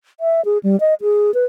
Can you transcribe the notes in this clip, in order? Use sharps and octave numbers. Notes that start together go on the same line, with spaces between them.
E5
G#4
G3
D#5
G#4
B4